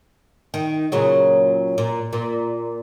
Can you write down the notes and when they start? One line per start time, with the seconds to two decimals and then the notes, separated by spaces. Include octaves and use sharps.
0.54 D#3
0.92 A#2 C#3 F#3
1.78 A#2
2.13 A#2